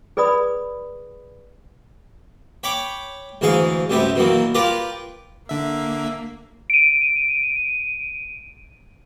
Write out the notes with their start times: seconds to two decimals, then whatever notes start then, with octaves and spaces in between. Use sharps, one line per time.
0.17 G#4 B4 D5 B5 D#6
2.63 C#5 G5 B5 C#6 D6
3.41 D2 G#2 E3 G#4 F5 C#6
3.90 C2 F#2 C3 A3 G4 B4
4.16 B2 D#3 E3 F#3 A#3
4.55 F4 G4 A#4 B4 D5
5.49 D3 A#3 E5
6.70 D7 D#7